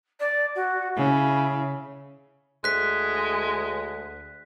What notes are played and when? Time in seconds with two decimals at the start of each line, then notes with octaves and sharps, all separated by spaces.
0.20 D5
0.55 F#4
0.95 C#3 E4
2.64 D2 G#3 F#6 B6